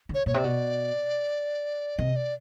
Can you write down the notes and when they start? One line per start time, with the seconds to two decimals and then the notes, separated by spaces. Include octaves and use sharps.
0.09 D3
0.14 C#5
0.26 A#2 C#5
0.34 C3 D5
0.44 B2
1.98 C3 D#5
2.16 D5